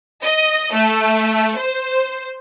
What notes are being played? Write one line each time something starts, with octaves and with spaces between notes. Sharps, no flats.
D#5
A3
C5